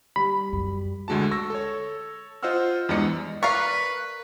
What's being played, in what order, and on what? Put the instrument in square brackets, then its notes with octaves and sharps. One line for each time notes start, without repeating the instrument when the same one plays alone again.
[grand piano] G3 [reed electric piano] B5
[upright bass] F#2
[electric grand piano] D2 D3 G#3 F#4 A5
C#6 E6 A#6
A4 C#5
F4 C5 D#5 F#5 E6 F6
E2 G2 G#3 D5 D#5 C#7
[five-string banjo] A#4 D5 F5 [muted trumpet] B4 [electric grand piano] C#6